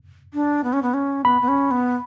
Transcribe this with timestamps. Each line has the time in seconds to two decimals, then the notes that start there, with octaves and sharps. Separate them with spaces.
0.34 D4
0.64 B3
0.73 C#4
0.82 B3
0.94 C#4
1.24 B3 B5
1.42 B3
1.48 C#4
1.71 B3